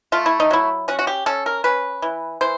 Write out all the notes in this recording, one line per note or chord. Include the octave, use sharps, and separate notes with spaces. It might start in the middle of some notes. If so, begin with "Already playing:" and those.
A3 F4
E4
D#4
F#3 E4
C#4 F#4
F#4
G4
C#4 A4
A#4
C#4 B4
E3
E3 C5